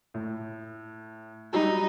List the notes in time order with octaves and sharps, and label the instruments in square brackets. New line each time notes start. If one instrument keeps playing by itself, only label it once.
[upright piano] A2
[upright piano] F#3 G3 [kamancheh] D#4